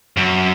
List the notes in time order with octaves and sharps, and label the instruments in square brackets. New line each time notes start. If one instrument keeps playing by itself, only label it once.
[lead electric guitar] F#2